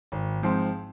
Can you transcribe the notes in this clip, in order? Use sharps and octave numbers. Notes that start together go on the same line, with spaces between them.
G#1
G#2 F3 C4